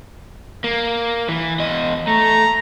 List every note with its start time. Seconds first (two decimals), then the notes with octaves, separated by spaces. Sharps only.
0.64 A#3
1.29 E3
1.59 E2 D#5
2.07 A3 A#5